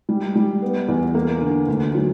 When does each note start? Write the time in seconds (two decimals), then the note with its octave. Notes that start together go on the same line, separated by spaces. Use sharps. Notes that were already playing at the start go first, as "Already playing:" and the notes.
0.09 G3
0.36 G3
0.62 B3
0.88 E2
1.15 A#3
1.41 D3
1.68 D2
1.95 F#3